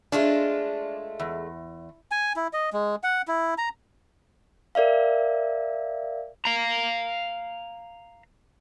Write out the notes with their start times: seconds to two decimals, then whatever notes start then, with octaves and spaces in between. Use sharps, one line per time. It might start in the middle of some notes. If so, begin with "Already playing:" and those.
0.12 G#3 A3 D4 F4
1.20 E2
2.11 G#5
2.36 E4
2.53 D#5
2.73 G#3
3.03 F#5
3.28 E4
3.58 A#5
4.75 A#4 D5 E5 F5
6.45 F5 A#5